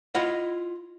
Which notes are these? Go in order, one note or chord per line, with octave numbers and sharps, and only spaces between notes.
E4 F4 D#5 F#5